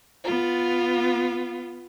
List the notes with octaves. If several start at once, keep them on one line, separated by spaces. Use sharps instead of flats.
B3 F4